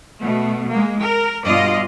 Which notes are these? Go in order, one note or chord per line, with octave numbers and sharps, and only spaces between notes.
B2 A3
G#3 A#3
A#4
G2 B2 F4 D5 D#5 F5